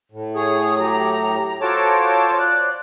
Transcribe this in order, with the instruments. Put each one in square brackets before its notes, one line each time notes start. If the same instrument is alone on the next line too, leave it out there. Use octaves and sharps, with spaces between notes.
[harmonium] A2
[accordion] G#4 C#5 [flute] D#6
[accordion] F#3 G4 [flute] A#5
[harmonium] F4 A4 C5 [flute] F#4 [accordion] C#5 A5 D6
[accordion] D5 [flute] F#6